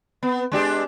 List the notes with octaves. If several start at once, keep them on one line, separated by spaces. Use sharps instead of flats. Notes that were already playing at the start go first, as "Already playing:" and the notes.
B3
G#3 D4 G4